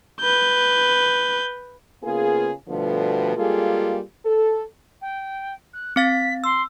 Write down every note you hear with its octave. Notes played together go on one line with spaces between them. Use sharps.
B4 G6
C#3 A#3 B3 F4 G#4
B2 D3 F3 G3 A3 B3
G3 G#3 A#3 F4 G#4 A4
A4
G5
F#6
C4 F5 A6 B6
C6 E6